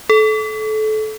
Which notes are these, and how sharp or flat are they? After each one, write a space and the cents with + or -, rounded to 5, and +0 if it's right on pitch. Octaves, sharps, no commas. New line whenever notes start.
A4 -25